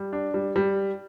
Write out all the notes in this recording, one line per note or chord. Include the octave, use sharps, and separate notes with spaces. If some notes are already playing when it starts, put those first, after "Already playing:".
Already playing: G3
D4
G3
G3